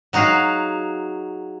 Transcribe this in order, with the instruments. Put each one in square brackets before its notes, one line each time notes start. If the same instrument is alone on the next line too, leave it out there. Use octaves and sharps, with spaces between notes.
[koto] F#3 D#4 F#4 G#4 F5